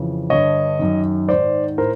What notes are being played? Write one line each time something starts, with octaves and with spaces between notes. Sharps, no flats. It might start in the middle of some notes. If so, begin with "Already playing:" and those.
Already playing: F2 C#3 E3
G2 D3 C#5 D#5
F#2 D#3
G#2 D#3 C5 D5
A2 A#4 C5